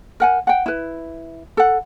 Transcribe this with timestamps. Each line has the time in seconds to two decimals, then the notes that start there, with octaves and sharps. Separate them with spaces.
0.20 A#4 F#5 G#5
0.47 F#5 G5
0.66 E4 B4
1.57 A4 F#5